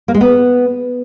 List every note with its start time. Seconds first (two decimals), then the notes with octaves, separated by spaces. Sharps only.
0.08 A#3
0.14 G#3
0.21 B3